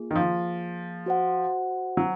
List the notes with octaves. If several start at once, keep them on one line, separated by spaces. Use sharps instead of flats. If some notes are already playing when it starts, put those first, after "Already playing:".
Already playing: A#3 F4 G#4
D#3
F3
F#4 C5 F#5
F#3